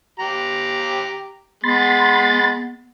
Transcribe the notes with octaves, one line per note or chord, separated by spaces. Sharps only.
G4 A#5
G#3 B3 B5 C6 A6